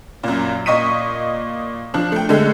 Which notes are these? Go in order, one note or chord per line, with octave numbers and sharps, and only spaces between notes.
F#2 A#2
A#2 D#5 C#6 D#6 B6 D#7
F3 D4
A3 G5
D3 G#3 A3